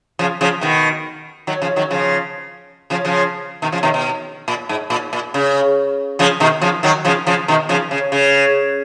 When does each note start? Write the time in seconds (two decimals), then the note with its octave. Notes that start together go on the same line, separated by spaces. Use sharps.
0.19 C#3 F3
0.41 C#3 F3
0.61 B2 D#3
1.47 D#3 F#3
1.62 C#3 F3
1.76 D#3 F#3
1.90 C#3 F3
2.90 C#3 F3
3.05 C#3 F3
3.62 B2 D#3
3.72 C#3 F3
3.83 B2 D#3
3.94 B2
4.48 A#2
4.69 G#2
4.90 A#2
5.13 A#2
5.34 C#3
6.19 C#3 F3
6.40 B2 D#3
6.62 C#3 F3
6.83 D#3 F#3
7.05 C#3 F3
7.27 C#3 F3
7.48 B2 D#3
7.69 C#3 F3
7.91 C#3
8.12 C#3